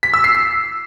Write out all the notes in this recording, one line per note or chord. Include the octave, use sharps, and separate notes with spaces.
B6
E6
C7
C7